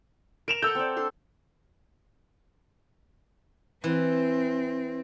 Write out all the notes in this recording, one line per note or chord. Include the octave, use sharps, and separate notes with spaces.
A#4 D7 E7 F7
A4 F#5 E6 G6
C4 D5
D4 A4 C6
E3 C4